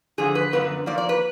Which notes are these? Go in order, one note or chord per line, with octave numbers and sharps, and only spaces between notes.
F2 D3 F3 G#4
B4
F#2 D3 F3 B3 B4
F2 F3 A#3 D5
D5
B4